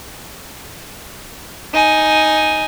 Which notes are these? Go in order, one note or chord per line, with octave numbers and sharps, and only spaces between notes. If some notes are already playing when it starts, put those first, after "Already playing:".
D#4 G#5